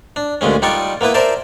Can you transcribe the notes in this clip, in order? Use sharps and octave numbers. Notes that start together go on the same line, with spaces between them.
D4
D2 A#2 G#3 C#4
G3 D#4 F4 D5 F#5 C#6
A#3 B3 E4 B4
A#4 C5 D5 E5 A5